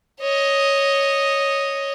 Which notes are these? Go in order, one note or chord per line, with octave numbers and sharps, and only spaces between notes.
C#5 D#5